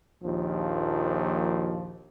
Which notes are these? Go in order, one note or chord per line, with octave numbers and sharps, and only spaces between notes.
A#1 D#2 F3